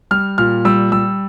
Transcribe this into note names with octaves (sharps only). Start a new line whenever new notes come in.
G3 F6
A#2 F6
G3 E6
G3 E6